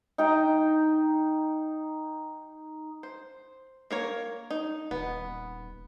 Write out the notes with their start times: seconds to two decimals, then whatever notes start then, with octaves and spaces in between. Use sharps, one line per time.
0.18 D#4 G5 A#5
3.03 C5
3.91 A#3 A#4 C#5
4.50 D#4
4.91 D#1 B3